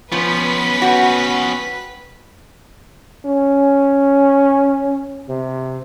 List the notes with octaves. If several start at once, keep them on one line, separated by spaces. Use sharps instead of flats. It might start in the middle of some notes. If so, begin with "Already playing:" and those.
F3 B3 C#4 B4 B6
F#4 F#5 G5
C#4
C3